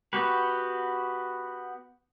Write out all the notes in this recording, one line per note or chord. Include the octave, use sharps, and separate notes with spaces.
B3 F#4 G4 B4